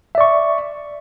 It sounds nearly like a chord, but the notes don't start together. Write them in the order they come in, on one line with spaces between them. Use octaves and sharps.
E5 D5 C#6